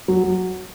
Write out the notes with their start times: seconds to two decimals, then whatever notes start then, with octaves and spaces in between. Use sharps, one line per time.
0.08 F#3
0.24 F#3